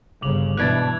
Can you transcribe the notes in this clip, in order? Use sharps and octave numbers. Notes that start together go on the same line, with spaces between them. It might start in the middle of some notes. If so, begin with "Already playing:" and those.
G1 C#3 D6 F7 F#7
G#2 B2 E3 D4 F#6 G#6 A6